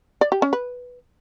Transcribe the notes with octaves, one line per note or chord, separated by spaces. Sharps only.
D5
G4
C#4
B4